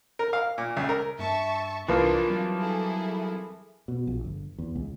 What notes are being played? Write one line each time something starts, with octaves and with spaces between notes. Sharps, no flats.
A#4
F5
A#2
C#2
A#4
G2 A#3 E5 A5 C#6
C2 E3 F3 A#3 D4 F4 D5 C7
F#3 G3 C4
E4 G#4 A4
B2
A#1
G1
E2
C#2